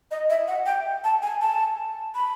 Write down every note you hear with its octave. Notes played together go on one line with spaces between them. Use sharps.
D#5
E5
F#5
G5
A5
G#5
A5
B5